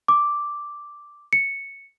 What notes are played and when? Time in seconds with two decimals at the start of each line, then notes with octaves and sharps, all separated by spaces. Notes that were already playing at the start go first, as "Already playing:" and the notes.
0.08 D6
1.33 C#7